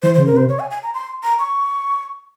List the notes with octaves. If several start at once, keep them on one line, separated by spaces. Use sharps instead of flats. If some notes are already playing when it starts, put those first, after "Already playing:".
E3 C5
C5
C#3
A#4
C3 C5
C#5
G#5
G#5
A#5
C6
A#5
C#6